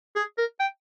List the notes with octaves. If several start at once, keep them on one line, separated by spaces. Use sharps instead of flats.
G#4
A#4
G5